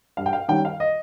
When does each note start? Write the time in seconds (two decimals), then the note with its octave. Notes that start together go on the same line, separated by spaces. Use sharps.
0.17 G2 F5
0.26 G5
0.33 F5
0.48 D#3 G3 C#4 G5
0.65 F5
0.80 D#5